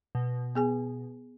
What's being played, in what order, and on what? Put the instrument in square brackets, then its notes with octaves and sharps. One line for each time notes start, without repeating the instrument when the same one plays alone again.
[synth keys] B2
[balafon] B3 G#4 G#5